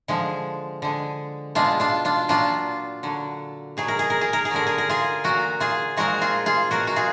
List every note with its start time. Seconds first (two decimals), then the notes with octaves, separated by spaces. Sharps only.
0.08 D3 F3 G#3
0.82 D3 G#3
1.55 B2 G#3 D4 F4
1.80 D4 F4
2.05 D4 F4
2.28 A#2 F#3 D4 F4
3.03 D3 F#3
3.77 B2 F#3 G#4
3.88 A#4
3.99 G#4
4.10 A#4
4.21 G#4
4.33 A#4
4.45 G#4
4.51 D3 F#3 A#4
4.67 G#4
4.78 A#4
4.89 F4 G#4
5.24 A#2 F#3 F#4 A#4
5.60 F4 G#4
5.97 A#2 F3 G#3 F#4 A#4
6.21 F4 G#4
6.46 F4 G#4
6.71 B2 F#3 F#4 A#4
6.87 F#4
6.96 F4 G#4